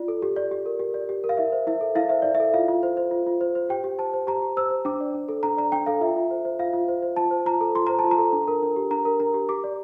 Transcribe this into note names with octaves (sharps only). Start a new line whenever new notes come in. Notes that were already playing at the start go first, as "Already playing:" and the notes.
Already playing: F4 D5
A4
G4
D5
G4
A#4
G4
D5
G4
A#4
F5
E4 E5
C5
E4 E5
A4
E4 F5
C5 E5
E4 D5
E5
A4
F4 F5
F4
C5
C5
F4
F4
C5
C5
G4 G5
G4
C5 A5
C5
G4 A#5
G4
C5 E6
C5
D4 D6
D5
D4
A4
D4 A#5
D5 A#5
D4 G5
A4 F5
F4 E5
F4
C5
C5
F4 F5
F4
C5
C5
F4 A5
C5
F4 A#5
A4
F4 C6
C5 A#5
A5
F4
A#5
A4
D4
A#4
D4
G4
D4 A#5
A#4
D4 A#5
G4
G4 D6
D5